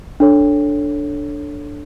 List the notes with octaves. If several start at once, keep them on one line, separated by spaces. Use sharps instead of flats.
D4 A4 C#5